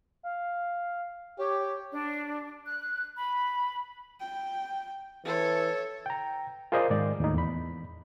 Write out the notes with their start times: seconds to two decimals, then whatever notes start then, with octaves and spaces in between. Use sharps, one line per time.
0.23 F5
1.38 G4 C#5
1.93 D4
2.65 F#6
3.18 B5
4.20 G5
5.25 E3 A4 C#5
6.06 G5 A#5
6.72 F4 G#4 A#4 C5 D5 D#5
6.90 G#2 D#3 G#3 D5
7.20 D#2 A2 D#4
7.34 E2 B5